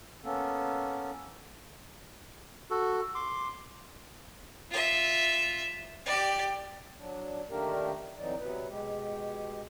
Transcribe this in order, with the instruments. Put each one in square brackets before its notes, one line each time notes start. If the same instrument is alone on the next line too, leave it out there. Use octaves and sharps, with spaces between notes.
[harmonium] A#3 B3 C#4 A4
[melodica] F#4 A4
C6 D6
[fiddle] F4 E5
G4 D5
[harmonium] F#3 D4
D#3 A3 A#3 D4 G4 A#4
F2 E3 F#3 D#4 D5
C3 F#3 B3 B4
B2 G#3 G4